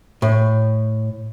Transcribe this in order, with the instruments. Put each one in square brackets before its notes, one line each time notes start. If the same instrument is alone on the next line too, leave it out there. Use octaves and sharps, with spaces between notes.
[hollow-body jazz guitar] A2